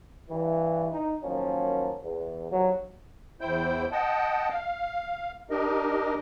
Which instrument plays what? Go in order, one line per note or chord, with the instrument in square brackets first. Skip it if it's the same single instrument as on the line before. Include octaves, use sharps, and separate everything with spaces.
[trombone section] G2 E3
D#4
D#3 F3 F#3 A#3 C#4
E2
A#1 D#2 F#3
[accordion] E2 E4 C5 G5 G6
D#5 F#5 G5 A5
F5
D4 D#4 G4 A#4 D#5